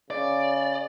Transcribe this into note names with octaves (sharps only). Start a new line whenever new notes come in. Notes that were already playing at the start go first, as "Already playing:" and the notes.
C#3 D5